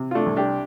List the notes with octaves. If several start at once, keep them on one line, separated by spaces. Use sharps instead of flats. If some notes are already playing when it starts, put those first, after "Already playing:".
Already playing: C3
F4
A3 D4
C2
D4 G4